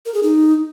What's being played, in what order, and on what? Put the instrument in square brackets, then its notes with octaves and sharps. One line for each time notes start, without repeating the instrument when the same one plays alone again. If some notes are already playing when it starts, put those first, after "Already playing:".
[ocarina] A#4
G#4
D#4